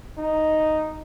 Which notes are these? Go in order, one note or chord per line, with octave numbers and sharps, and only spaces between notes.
D#4